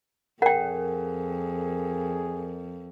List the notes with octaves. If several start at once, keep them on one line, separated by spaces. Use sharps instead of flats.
F2 G#4 A#4 F#5 G5